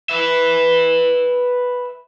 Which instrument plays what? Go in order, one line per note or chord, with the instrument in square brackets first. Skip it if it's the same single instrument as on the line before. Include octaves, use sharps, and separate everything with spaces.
[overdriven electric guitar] B4 E5